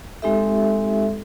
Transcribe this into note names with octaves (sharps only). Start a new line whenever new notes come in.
G#3 C4 D#4 G4 A4 E5